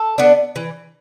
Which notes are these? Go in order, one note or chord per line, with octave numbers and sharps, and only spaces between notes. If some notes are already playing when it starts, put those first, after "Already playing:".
Already playing: A4
B3 D4
E3